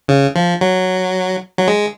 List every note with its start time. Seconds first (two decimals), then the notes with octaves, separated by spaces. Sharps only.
0.08 C#3
0.36 F3
0.61 F#3
1.58 F#3
1.67 G#3